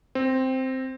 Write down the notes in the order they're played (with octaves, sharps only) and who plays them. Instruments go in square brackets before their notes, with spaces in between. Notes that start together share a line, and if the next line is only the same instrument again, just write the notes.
[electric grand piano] C4